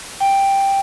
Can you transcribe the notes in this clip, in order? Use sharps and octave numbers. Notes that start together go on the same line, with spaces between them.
G5